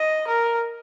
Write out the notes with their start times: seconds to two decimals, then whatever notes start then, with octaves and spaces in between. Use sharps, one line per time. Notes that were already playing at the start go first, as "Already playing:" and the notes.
Already playing: D#5
0.27 A#4